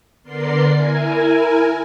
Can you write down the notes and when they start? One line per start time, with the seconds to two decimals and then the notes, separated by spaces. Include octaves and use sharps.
0.23 D3 B3 A#4 D5 C6 C7
0.74 E4 A#4 G#5